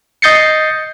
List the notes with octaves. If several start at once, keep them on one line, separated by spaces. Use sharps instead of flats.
D#5 D#6 G6 A6 C7 C#7